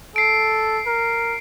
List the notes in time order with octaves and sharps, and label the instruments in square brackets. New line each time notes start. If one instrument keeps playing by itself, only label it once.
[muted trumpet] A4 [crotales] C7 D7
[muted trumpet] A#4